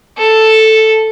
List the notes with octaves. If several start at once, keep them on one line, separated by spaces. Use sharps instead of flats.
A4